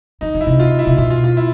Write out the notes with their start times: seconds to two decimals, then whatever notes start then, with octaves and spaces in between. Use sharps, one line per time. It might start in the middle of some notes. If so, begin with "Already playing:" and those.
0.21 D#3 D#4
0.34 D3
0.41 E4
0.47 C3
0.60 F4
0.79 E4
0.87 C3
0.97 B2 F4
1.10 F4
1.24 F4
1.37 E4